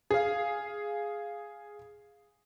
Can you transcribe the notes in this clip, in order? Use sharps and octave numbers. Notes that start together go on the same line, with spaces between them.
G#4 F5